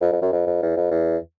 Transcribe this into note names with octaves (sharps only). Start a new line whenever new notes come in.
F2
F2
F#2
F2
F2
E2
F2
E2